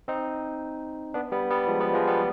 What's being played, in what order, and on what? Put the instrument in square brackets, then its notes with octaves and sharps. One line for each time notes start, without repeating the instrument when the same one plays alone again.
[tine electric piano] C4 D#4
B3 D4
G3 B3
G3 B3
F3 G#3
G3 B3
F3 G#3
G3 B3